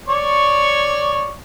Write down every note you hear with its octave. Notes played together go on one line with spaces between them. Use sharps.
C#5 D5 C#6